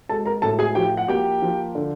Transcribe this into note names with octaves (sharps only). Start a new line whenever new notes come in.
G#3 A4 A5
A#4 A#5
A2 A4 A5
G#4 G#5
F3 G4 G5
F#5
A#3 G4 G5
F3
D3